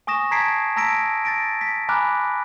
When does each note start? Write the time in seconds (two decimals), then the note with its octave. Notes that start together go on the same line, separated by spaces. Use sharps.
0.07 G#5 C#6 D#6 A#6 E7
0.31 A5 A#5 G#6 B6 C7 D7
0.76 A5 A#5 E6 A#6 B6 D7
1.25 A6 A#6 D7
1.61 B6
1.89 G#5 A#5 B5 D6 F6 F#6